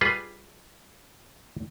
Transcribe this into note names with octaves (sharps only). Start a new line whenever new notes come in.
G3 F4 G#4 B4